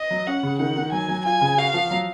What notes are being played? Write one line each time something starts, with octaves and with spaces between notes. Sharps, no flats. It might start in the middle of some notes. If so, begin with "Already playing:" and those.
Already playing: D#5
F#3
C#4 F#5
C#3
D#3 F#5
D#3
F#3 G#5
F#3
F4 G#5
C#3
F#4 F5
F3
F#3